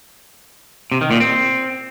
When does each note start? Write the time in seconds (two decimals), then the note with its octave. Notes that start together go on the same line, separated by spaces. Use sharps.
0.92 C3
1.01 D#3
1.11 A#2
1.20 C4